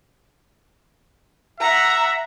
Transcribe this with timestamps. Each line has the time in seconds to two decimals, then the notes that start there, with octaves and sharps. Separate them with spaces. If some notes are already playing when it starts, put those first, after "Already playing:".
1.60 E5 F#5 A#5